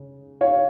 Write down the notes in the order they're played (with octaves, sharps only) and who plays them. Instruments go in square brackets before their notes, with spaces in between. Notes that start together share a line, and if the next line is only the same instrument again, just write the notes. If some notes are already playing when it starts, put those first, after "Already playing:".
Already playing: [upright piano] C#3
C#5 F5